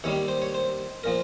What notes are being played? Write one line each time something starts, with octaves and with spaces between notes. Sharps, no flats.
D#2 D#3 G3 C#5
C5
C#5
C5
A#2 F3 A#4